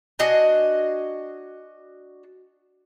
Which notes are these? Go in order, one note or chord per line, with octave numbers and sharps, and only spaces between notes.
D4 F#4 D#5 G#5